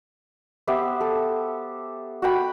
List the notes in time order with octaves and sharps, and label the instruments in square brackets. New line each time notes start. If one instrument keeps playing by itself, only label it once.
[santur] B3 G4 C5 E5
A4
F#4 F#5 G5 B5